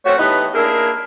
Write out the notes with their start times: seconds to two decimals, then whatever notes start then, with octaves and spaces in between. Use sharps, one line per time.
0.05 A3 C4 C#4 F#4 C5 C#5
0.18 E3 A3 B3 D#4 G4 B4
0.54 A#3 D4 E4 G#4 A#4